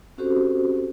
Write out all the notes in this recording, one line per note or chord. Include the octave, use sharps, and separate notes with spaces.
C4 C#4 F#4 G4 A4 C5